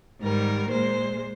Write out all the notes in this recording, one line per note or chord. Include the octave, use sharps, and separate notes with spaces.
G#2 D#3 G3 A#4
A#2 G#3 C5